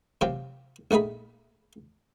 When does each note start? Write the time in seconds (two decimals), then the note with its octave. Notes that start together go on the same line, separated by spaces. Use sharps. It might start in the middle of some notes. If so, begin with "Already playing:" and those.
0.21 C3 F3 F#3 C4
0.91 A#1 A3 D#4 G#4 B5